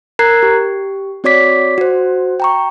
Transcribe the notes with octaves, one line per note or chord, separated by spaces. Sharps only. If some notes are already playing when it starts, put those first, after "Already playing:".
A#4 A#5 F#6 G#6 C7
G4
C4 F#4 C#5 D5 D6 B6
F#4 C5
G5 A#5 C#6